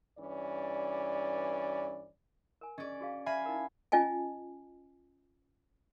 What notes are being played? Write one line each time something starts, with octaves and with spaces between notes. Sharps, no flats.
G2 E3 C#4 D5
A#4 G#5
C#4 G#4 D5 D#5
F#4 G#4 F5
E5 F5 G#5 B5
D#4 E4 A#4
C#4 F4 D#5 G#5 A5